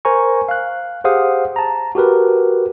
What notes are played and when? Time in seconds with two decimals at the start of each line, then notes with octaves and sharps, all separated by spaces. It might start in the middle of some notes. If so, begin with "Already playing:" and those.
0.05 A#4 C5 G#5 A#5 C#6
0.49 F5 F#6
1.04 G4 G#4 C5 F5 F#5 D#6
1.56 A5 A#5
1.95 F#4 G4 A#4 B4